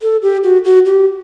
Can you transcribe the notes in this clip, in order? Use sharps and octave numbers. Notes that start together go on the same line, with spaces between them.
A4
G4
F#4
F#4
G4